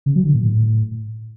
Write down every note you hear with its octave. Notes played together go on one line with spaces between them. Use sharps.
C#3
F#3
D3
A#2
A2